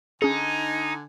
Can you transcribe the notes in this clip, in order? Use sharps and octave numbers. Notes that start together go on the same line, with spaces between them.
D3 C#4 D#4 G#4 G#5